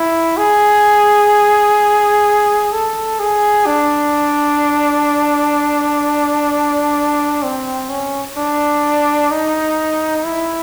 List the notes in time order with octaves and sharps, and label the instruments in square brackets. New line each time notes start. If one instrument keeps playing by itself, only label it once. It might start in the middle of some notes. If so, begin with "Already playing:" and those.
Already playing: [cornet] E4
G#4
A4
G#4
D4
C4
C#4
D4
D#4
E4